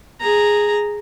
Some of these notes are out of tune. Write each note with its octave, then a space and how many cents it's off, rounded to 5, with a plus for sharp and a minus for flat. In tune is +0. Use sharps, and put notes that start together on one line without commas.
G#4 +0 A#5 -5